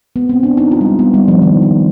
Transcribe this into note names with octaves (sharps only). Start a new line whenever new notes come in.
B3
C4
D4
D#4
F4
G3
G#3
B3
G3
F3
D#3
F3